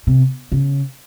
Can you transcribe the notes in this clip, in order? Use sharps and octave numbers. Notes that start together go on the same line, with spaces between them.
C3
C#3